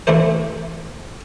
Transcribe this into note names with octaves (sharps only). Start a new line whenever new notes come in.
E3 A3 D4 C5